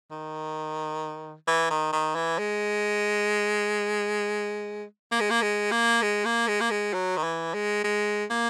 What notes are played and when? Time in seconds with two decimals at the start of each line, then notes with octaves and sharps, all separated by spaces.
0.11 D#3
1.48 E3
1.70 D#3
1.92 D#3
2.15 E3
2.39 G#3
5.11 A#3
5.20 G#3
5.30 A#3
5.42 G#3
5.72 A#3
6.02 G#3
6.25 A#3
6.48 G#3
6.60 A#3
6.71 G#3
6.93 F#3
7.17 D#3
7.23 E3
7.54 G#3
7.84 G#3
8.30 A#3